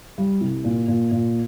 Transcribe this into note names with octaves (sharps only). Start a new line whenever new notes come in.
G3
C2
A#2
A#2
A#2